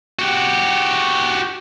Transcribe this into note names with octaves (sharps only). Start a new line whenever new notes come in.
F#4 G4